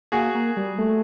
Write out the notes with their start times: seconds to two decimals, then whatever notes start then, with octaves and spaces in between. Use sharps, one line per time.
0.12 A#3 F#4 G#4
0.35 A#3
0.57 G3
0.78 A3